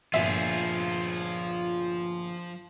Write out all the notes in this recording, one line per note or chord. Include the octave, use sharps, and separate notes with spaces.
G1 A#2 F3 F4 G#4 E5